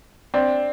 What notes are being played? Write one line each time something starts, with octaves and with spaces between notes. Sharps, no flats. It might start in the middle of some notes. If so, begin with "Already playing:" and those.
C4 D4